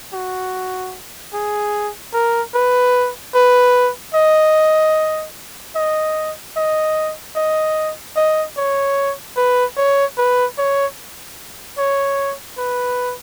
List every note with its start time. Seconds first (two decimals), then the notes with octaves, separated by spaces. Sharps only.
0.13 F#4
1.33 G#4
2.14 A#4
2.54 B4
3.34 B4
4.14 D#5
5.76 D#5
6.56 D#5
7.36 D#5
8.16 D#5
8.57 C#5
9.37 B4
9.77 C#5
10.18 B4
10.58 C#5
11.78 C#5
12.58 B4